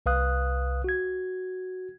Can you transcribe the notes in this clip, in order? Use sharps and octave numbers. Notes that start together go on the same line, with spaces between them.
C2 B4 F5 D#6 F#6
F#4 G#6